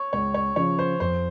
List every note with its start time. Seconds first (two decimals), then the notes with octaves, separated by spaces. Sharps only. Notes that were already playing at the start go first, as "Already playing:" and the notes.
Already playing: C#5
0.13 C#2 C#5
0.34 C#5
0.56 C#3 F3 C#5
0.79 C5
1.00 F2 C5